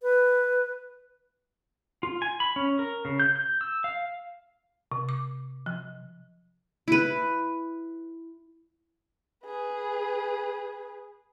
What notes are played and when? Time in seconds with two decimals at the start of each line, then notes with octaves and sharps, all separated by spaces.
0.02 B4
2.03 F4
2.22 G#5
2.40 B5
2.56 C#4
2.79 A#4
3.05 C#3
3.20 G6
3.36 G6
3.61 E6
3.84 F5
4.92 C3
5.09 D6
5.66 F3
6.88 E4 B4
9.46 G#4 B4